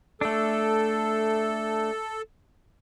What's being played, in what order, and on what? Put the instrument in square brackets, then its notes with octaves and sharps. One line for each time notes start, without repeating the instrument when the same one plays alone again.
[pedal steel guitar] A3 D4 [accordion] A4